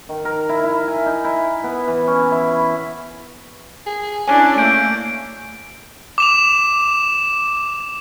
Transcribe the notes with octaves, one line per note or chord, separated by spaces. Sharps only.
D#3
A#4
E4
E4
G#5
D#4
E4
B3
E3
C#4
E4
G#4
C#4 D4 E4 G#5
A3 A#3 G6 D7
D6 E7 F7